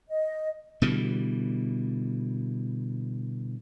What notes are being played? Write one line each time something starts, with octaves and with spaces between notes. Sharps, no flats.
D#5
B2 D3 E3 G3